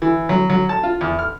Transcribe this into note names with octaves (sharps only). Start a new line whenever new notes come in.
E3
F#3
F#3
A5
F4
E2
F6